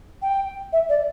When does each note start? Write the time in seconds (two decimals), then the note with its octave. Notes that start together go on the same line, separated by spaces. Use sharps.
0.22 G5
0.72 E5
0.89 D5